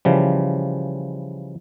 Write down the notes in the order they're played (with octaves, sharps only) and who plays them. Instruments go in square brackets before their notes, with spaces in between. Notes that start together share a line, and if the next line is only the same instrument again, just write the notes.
[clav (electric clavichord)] C#3 E3 F3 G3